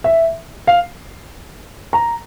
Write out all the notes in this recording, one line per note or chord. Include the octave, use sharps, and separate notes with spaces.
E5
F5
A#5